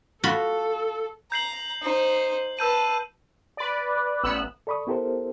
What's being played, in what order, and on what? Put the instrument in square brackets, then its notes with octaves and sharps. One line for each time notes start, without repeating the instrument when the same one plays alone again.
[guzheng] F4 F#4 B5 [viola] A4
[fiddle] A#5 [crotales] G6 C7 F#7
[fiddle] D#4 C5
[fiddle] B4 A5 [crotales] E6 G6 D#7
[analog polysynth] B4 D5
A1 B3 E6 F#6
[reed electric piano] A4 D5 B5 C#6 D#6
B3 E4 G4 A4 A#4 C5